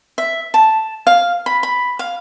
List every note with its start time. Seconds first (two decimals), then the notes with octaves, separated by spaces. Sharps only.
0.18 E5
0.54 A5
1.07 F5
1.46 B5
1.63 B5
1.99 F5